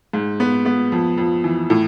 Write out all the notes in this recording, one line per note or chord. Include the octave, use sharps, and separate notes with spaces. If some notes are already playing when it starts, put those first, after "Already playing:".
G#2
B3
B3
F2
F2
E3
A2